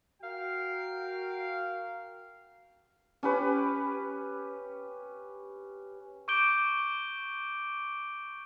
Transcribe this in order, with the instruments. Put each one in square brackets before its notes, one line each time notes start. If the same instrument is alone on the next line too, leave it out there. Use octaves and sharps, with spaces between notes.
[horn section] F#4 A#4 F5 G5
[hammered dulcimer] C#4 G4 B4
[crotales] C#6 D6 G6 D7 G7